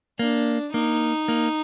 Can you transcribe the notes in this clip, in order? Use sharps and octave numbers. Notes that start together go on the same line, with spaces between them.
A#3 D4
A#3 D#4
A#3